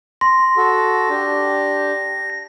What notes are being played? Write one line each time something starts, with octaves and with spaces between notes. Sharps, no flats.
C6 A#6
F#4 A4
D4 G4